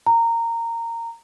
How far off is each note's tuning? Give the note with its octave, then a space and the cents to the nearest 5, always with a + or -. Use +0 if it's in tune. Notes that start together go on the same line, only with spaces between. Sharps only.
A#5 -15